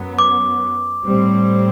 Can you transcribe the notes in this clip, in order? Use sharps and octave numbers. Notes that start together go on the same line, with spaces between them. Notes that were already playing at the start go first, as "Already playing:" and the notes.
Already playing: F#2 F#3 B3
D6
A2 G3 C4